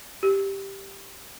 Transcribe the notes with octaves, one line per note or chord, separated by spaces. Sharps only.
G4